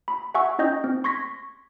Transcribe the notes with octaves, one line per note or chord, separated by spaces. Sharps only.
B5
E5 F#5 G#5 C#6 E6
C#4 D#4 D#5 G5 G6
C4
C6 C#6 G#6 A#6 B6